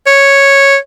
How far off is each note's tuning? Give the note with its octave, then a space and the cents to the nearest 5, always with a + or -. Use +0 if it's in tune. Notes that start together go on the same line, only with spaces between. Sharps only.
C#5 -5